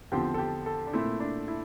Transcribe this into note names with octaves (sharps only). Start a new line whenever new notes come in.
E2 D3 F3 C4 G4
A4
G4
A4
D4
A#2 A3 C4 E4
D4
E4